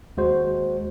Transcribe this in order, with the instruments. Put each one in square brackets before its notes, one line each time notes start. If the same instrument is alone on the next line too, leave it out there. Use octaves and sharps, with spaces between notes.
[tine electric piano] D#2 G#3 F#4 C5